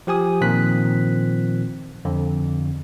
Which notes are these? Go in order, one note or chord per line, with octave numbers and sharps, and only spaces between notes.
F3 G4 G#5 D#6
A#2 D#3 F3 C4 F#6 B6
F2 D3